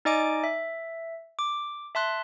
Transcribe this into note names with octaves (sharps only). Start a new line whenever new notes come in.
D#4 D5 D#5 G#5 D6 D7
E5
D6
E5 A5 C6 F#6